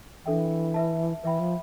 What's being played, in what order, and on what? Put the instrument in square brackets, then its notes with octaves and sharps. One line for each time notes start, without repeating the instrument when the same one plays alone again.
[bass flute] E3 [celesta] D4 A4 E5 G5
[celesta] B4 E5 A5
[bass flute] E3 [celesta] B4 E5 G5 B5
[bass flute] F3